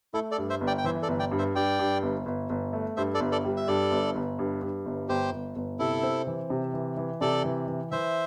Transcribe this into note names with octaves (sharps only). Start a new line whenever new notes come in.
A3 E4 A4
A4 D5
G2
C5 E5
G1
D5 G5
G5
E3 C5 E5
A4 D5
G1
D5 G5
G2
C5 E5
G2 D5 G5
G2
G1
G1
G1
A3
G2 C5 E5
A4 D5
G1
A4 D5
G3
E5
G2 A4 D5
G1
G1
G2
G2
G1
G1 G4 C5
G1
G1
C3 E4 A4
C4
E3
C3
E3
E3
C3 A4 D5
E3
E3
E3 C5 E5